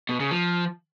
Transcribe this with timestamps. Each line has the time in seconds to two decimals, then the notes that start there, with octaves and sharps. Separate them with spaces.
0.09 B2
0.20 C#3
0.31 F3